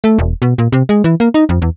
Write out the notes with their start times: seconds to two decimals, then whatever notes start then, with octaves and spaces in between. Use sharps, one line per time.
0.04 A3
0.19 E1
0.42 B2
0.58 A#2
0.72 C3
0.89 G#3
1.04 E3
1.20 A#3
1.34 D#4
1.49 F2
1.62 E2